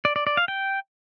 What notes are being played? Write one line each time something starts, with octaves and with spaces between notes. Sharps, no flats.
D5
D5
D5
F5
G5